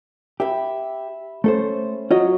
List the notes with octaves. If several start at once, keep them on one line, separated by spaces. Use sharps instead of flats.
G4 E5 B5
A3 C#4 A4 C5
F#3 F4 C#5 D#5